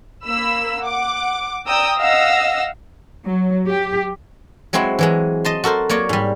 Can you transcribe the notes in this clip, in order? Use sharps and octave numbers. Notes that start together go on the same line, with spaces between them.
A#3 B5 E6
F#5 D6
D5 G5 A#5 D#6 E6
D#5 F5 F#5 E6 A#6
F#3
G4
F#3 G#3 C4 E4 F#4
E3 F#3 G#3
D#5 A5 C6
F#4 A4 A#4 C5
F#3 A#3 C#5 D5
G#2 G3